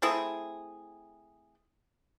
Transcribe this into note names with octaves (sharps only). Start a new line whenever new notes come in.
A3 C4 E4 G#4